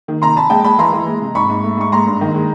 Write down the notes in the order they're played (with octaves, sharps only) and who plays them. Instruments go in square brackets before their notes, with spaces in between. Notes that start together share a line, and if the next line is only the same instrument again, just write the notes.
[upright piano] D#3
C3 A#5 C6
F2 A5 B5
G#3 G5 A5
G#3 A5 B5
E3 A#5 C6
E3
G#3
C3
G#2 B5 C#6
G#2
A3
G#2 C#6
G#3 A#5 C6
G2
D#3
G#3